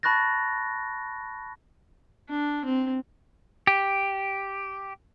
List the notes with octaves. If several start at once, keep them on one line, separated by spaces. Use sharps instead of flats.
A5 B5 C#6 F#6 A6 A#6
D4
C4
G4